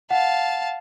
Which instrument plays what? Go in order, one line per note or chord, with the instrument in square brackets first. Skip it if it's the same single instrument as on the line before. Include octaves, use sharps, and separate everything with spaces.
[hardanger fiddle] F5 A5 [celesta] F#5